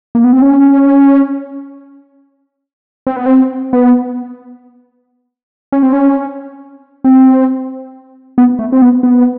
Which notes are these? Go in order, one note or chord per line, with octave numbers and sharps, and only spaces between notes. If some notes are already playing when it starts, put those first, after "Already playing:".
A#3
B3
C4
C#4
C4
B3
C4
B3
C#4
C4
C#4
C4
B3
A3
C4
B3
B3